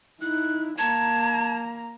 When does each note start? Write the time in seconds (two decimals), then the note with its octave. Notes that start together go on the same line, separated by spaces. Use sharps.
0.21 D#4 E4 F#6
0.78 A#3 A5 A#5 G#6